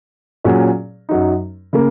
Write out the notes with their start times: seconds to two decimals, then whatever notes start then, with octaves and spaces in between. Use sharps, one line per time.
0.44 A#2 F#3 C#4 G#4
1.09 F#2 F#3 D#4
1.73 C#3 A#3